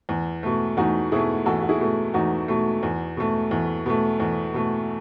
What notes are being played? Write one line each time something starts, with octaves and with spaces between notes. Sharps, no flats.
E2
B2 A3
E2 D#4 F#4
B2 A3 E4 G#4
E2 F#4 A4
F#4
E4 G#4
B2 A3
E2 D#4 F#4
B2 A3
E2
B2 A3
E2
B2 A3
E2
B2 A3